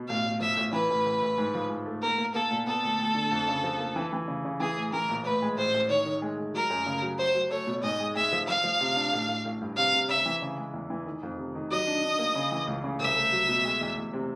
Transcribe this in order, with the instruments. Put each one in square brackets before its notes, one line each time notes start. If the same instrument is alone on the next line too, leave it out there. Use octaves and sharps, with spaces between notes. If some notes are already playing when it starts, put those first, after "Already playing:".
Already playing: [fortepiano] B2
[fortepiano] A1 [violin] F5
[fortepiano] A2
[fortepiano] F3 [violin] E5
[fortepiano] A1
[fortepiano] E3 [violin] B4
[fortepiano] A1
A1
A1
G#2
F3
G#2
A3
[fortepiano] A#3 [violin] A#4
[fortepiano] A#3
[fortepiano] A#3 [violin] A4
[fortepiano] A#2
[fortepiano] B3 [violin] A4
[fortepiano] D2
D2
D3
F2
C#3
F3
A#3
E3
E3
C#3
C#3
[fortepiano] E3 [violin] G#4
[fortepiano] A2
[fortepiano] E3 [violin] A#4
[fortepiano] A#1
[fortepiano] A2 [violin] B4
[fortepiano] G#3
[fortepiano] A1 [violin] C5
[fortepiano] A1
[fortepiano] D#3 [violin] C#5
[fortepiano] D#3
G#3
G#3
[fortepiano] F#3 [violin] A#4
[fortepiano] F#2
C#3
F#3
[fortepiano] F#3 [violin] C5
[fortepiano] F#3
[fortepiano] A3 [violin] C#5
[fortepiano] B2
[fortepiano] G#2 [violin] D#5
[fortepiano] G#3
[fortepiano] G#3 [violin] E5
[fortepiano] F3
[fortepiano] F3 [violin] F5
[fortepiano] F3
C3
D4
A1
A1
A1
G2
[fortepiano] C3 [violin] F5
[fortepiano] C3
[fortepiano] C3 [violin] E5
[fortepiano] E3
C#3
G#3
E2
E3
D#3
F2
C3
D#3
[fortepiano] F#3 [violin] D#5
[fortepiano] D4
D4
A#3
C#3
E3
C#2
C#3
[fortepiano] C2 [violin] E5
[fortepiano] A3
F#3
B2
G#3
E2
E2
C3